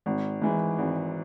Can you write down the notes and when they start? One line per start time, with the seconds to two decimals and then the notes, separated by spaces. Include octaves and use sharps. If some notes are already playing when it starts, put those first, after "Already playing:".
0.06 G#1
0.42 G#2 E3
0.78 G#1